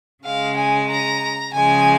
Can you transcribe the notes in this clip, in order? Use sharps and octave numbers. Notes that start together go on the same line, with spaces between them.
C#3 G#3 F5
G#5
A#5
C#3 F3 G#3 G#5